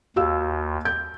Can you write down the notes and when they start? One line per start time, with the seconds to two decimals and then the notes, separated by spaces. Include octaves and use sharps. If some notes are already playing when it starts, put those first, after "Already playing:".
0.16 D#2 F#4 F5 E6
0.85 G6